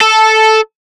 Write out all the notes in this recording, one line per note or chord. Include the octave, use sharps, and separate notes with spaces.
A4